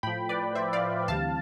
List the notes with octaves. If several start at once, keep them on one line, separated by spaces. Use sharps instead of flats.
A2 F3 G5 B5
B4 D5
C5 E5
D5 F5
D2 C3 E3 G3 F5 A5